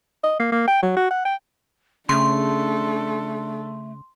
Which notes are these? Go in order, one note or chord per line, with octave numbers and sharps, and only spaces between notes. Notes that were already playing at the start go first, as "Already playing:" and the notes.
D#5
A#3
A#3
G5
F#3
F#4
F#5
G5
C#3 A3 D4 A4 C6